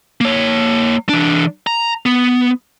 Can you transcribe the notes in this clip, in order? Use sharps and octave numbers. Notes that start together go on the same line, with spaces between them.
A#3 C#5
E3 D4
A#5
B3